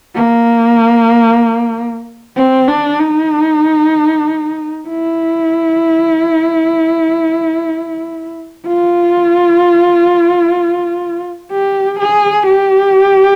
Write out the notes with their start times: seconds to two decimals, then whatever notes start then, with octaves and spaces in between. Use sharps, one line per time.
0.15 A#3
2.37 C4
2.68 D4
3.00 D#4
4.89 E4
8.68 F4
11.51 G4
11.99 G#4
12.47 G4